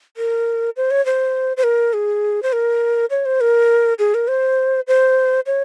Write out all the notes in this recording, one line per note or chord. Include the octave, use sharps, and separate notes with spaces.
A#4
C5
C#5
C5
C5
A#4
G#4
C5
A#4
C#5
C5
A#4
G#4
A#4
C5
C5
C#5